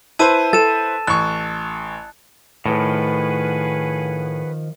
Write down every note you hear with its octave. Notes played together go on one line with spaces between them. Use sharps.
E4 B4 C5 A5 E6 D#7
A4 A6 E7
A1 C#6 F#6
A2 D#3 F3 G#4 B4 F#5